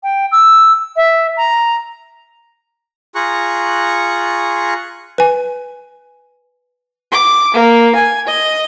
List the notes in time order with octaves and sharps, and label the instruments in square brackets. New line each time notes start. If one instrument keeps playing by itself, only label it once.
[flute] G5
E6
E5
A#5
[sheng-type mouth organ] F4 G#4 A#5 C#6 F#6
[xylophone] B4 G#5
[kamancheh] D6
A#3
G#5
D#5